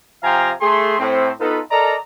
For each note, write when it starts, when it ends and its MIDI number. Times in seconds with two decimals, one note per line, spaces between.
0.23 0.51 48
0.23 0.51 53
0.23 0.51 77
0.23 0.51 79
0.23 0.51 80
0.23 0.51 82
0.61 0.96 57
0.61 0.96 68
0.61 0.96 84
0.99 1.30 45
0.99 1.30 60
0.99 1.30 72
1.40 1.59 59
1.40 1.59 63
1.40 1.59 65
1.40 1.59 69
1.40 1.59 71
1.71 1.96 69
1.71 1.96 70
1.71 1.96 74
1.71 1.96 75
1.71 1.96 82